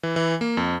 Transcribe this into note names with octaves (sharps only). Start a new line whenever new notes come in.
E3
E3
A#3
F2